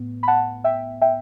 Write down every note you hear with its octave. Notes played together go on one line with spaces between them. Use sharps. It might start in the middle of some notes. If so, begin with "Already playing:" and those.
Already playing: A2 B3
B5
F#5 A5
E5 G5
E5 G5